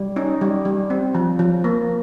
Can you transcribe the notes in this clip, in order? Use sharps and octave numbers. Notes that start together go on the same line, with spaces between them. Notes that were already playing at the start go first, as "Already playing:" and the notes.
Already playing: G3
C#4 D#4
G3
G3
C4
F3
F3
A#3